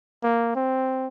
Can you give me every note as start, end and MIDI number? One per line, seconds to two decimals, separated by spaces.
0.23 0.52 58
0.55 1.08 60